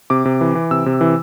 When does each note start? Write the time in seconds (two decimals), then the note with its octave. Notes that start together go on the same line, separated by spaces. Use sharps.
0.10 C3 D6
0.25 C3
0.41 E3
0.55 E3
0.71 C3 E6
0.86 C3
1.01 E3